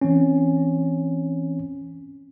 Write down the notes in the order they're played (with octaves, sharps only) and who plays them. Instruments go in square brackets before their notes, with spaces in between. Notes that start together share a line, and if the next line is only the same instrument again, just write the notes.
[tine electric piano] E3 C4 C#4